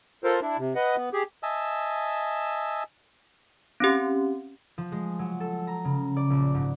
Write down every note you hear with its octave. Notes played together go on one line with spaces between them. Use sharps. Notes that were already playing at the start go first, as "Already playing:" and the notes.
F4 A4 A#4 C5
D4 E4
C3
B4 D#5 F#5
B3
G4 G#4
D#5 E5 G#5 A5 E6
C4 C#4 G4
F3
G#3
F#3
A4
A#5
C#3
D5
A#1
G#2